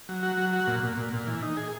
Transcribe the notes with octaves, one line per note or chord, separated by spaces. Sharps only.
F#3
F#4
F#3
F#4
A#2
A#2
A#2
A#2
E3
D#4
G#4